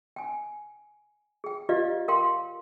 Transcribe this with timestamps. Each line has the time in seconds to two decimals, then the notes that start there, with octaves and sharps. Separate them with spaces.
0.16 G5 G#5
1.44 G#4 G5
1.69 F4 G4 B4 D5 D#5 F5
2.08 A#4 F5 G5 C6